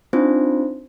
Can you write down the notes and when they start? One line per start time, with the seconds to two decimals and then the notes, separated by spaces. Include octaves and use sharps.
0.13 C4 D4 D#4 F4 C5